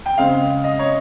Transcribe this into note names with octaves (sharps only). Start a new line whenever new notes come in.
G5
C#3 G#3 C4 F5
D#5
C#5